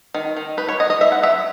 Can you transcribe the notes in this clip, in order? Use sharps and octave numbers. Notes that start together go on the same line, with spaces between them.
D#3
D#3
D#4 B4
C#5
B3 D#5
D#5
D#4 E5
F#5
F#3 E5